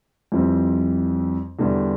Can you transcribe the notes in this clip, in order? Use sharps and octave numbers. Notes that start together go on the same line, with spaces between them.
F2 E3 G3 C4
E2 D3 G3 D4